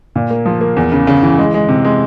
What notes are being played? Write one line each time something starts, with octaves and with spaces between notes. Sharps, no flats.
A#2
A#3
F3
A#3
E2
C#3
C#3
E3
G#3
G#3
C3
G#3